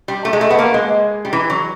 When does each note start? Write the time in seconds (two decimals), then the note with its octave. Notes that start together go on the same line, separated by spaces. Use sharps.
0.08 G3
0.25 A3
0.33 G#3
0.41 A3
0.50 B3
0.59 A#3
0.74 G#3
1.25 G3
1.33 E3
1.50 F#3